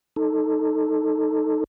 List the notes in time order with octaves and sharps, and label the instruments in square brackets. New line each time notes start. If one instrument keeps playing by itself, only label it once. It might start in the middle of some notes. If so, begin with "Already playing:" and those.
[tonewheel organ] D#4 A4